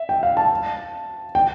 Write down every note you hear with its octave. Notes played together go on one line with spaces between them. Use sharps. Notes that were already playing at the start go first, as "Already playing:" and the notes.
Already playing: E5
G5
F5
A5
G5